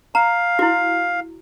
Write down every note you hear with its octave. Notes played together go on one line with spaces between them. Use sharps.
F5 A#5
E4 F#4